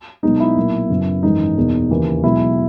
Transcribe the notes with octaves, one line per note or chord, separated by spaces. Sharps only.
B1 B2 G#3 B3 D#4
E4
B1 A#2 A#3
F#2 C#3 F#3 B3
G#1 F#2 E3 G#3 D#4
E2 B2 A#3
D#2 C#3 E3 A#3
B1 B2 G#3 E4